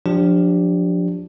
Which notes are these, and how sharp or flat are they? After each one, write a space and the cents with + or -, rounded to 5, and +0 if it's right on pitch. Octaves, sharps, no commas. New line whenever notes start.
F3 +25 D4 +0 G4 +0